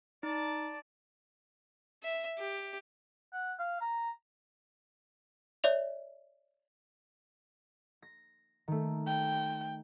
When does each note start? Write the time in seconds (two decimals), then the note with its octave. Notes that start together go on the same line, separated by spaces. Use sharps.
0.23 D#4 D5 A5
2.03 E5
2.38 G4
3.33 F#5
3.59 F5
3.81 A#5
5.64 C#5 D5 E5 F7
8.02 A#6
8.68 D#3 A3
9.07 G5